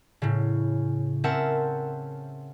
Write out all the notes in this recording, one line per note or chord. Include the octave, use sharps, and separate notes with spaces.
A2 C#3
C4 C#4 A#4 E5 F#5 A5